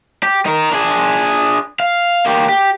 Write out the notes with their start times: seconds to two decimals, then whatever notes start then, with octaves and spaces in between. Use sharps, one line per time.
0.23 G4
0.46 D#4 A#4
0.71 D4 G#4
1.80 F5
2.26 A#3 G4
2.49 G4